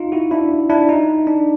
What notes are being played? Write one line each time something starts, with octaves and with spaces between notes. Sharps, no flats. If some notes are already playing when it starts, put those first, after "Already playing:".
Already playing: D#4 F4
E4 F#4
D4 E4
D4 E4
D#4
D4